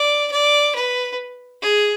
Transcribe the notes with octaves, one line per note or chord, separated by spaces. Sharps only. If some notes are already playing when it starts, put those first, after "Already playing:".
Already playing: D5
D5
B4
G#4